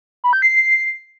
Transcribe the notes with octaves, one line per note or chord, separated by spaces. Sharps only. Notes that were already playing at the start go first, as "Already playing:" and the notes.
B5
G6
C7